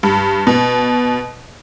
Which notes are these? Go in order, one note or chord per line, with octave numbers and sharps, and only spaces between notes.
G2
B2